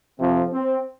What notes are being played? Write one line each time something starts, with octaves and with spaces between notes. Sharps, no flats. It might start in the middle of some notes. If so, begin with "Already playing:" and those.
F2 C3 F3 C4
C4